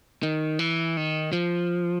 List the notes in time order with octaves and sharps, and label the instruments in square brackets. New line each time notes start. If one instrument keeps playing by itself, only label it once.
[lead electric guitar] D#3
E3
D#3
F3